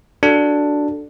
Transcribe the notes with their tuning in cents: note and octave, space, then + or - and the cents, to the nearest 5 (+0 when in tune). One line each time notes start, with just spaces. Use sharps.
D4 +0 F#4 +0 A4 +0